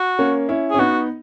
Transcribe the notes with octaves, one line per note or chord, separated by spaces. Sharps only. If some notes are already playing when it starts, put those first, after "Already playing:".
Already playing: F#4
A#3 C#4
C#4 E4
G#4
C#4
B3 D#4 F#4